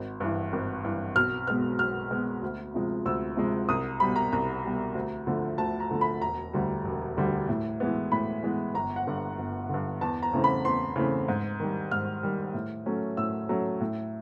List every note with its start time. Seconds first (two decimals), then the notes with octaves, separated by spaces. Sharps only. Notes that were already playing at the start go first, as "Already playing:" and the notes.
Already playing: G#1
0.20 G2 E3
0.53 G#1
0.85 G2 E3
1.16 B1 F6
1.47 B2 G#3 B3 F6
1.79 B1 F6
2.11 B2 G#3 B3
2.42 D2
2.74 C3 F3 G#3
3.05 D2 E6
3.37 C3 F3 G#3
3.69 C2 D#6
4.00 B2 G3 B5
4.16 A#5
4.32 C2 A#5
4.64 B2 G3
4.95 D2
5.27 D3 F3 A3
5.58 D2 A5
5.80 A#5
5.91 D3 F3 A3
6.01 B5
6.22 E1 A#5
6.53 D2 D3 G3
6.85 E1
7.17 D2 D3 G3
7.49 A2
7.80 E3 G#3 B3
8.12 A2 B5
8.43 E3 G#3 B3
8.75 G1 A#5
8.96 F#5
9.07 G2 D3
9.39 G1
9.69 G2 D3
10.01 E2 A5
10.23 A#5
10.33 C#3 E3 A3 C4
10.44 B5
10.65 E2 C6
10.96 C#3 E3 A3 C4
11.28 G#2
11.60 D#3 G3
11.91 G#2 F6
12.23 D#3 G3
12.54 A2
12.86 F#3 A3 C#4
13.17 A2 E6
13.49 F#3 A3 C#4
13.80 A2